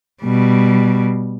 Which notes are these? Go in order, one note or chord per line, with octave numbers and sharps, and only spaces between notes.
B2 G3